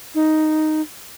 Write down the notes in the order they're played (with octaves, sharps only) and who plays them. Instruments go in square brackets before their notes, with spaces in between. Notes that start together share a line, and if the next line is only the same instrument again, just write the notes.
[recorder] D#4